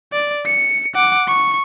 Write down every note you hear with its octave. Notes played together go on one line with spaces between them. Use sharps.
D5
C#7
F#5 D6
C#6